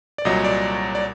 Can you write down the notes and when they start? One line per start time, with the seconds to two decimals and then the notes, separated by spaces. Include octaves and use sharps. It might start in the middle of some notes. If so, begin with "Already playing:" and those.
0.18 D5
0.25 C2 A#2 F#3 D#5
0.44 D5
0.95 D5